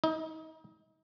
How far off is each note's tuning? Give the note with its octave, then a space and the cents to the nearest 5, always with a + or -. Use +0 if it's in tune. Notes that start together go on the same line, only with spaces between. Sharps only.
D#4 +35 D#5 +10